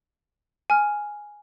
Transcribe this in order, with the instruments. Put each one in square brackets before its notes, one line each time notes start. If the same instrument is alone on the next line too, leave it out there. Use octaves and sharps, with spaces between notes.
[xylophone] G#5 F6